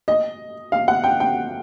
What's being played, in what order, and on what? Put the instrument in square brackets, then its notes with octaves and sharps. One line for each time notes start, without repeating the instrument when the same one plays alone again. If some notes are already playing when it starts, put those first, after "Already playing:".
[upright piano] D#5
F5
F#5
G5
G5